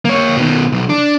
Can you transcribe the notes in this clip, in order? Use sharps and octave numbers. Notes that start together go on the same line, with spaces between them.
A#3 C#5
B2 D#3
B1
D4